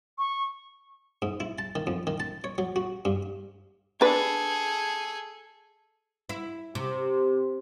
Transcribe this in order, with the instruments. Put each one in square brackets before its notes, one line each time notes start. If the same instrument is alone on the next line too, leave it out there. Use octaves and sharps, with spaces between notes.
[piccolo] C#6
[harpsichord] G#2
E4
A5
D#3
F2
D#3
A5
C#5
F#3
F#4
G2
[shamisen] D4 B4 [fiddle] G#4 A4
[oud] E4
C3